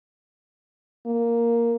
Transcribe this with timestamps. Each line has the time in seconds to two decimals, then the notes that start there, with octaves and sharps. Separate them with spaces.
1.06 A#3